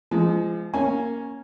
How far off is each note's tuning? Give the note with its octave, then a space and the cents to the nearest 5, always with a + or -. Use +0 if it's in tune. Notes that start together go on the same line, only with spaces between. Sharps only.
F3 -30 G#3 +0
A#3 +0 C#4 -5 G#5 -5